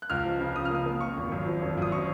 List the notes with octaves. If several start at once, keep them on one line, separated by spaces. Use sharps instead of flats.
F#6
C#2 F6
F3
C#3
C#3 D#6
F6
A#3 D#6
A#3
A#3 C#6
G#1
F#2
F3
G#1
F#2 D#6
F3 C#6